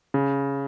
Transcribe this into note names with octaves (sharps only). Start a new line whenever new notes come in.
C#3